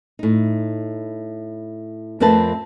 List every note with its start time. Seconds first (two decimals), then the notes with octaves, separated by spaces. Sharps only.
0.19 A2 D#4
2.20 F2 A3 C4 A#4 B4 A5